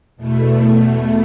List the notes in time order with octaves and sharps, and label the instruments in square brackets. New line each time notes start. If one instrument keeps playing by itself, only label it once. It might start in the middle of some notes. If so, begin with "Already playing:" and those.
[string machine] E2 B2 A3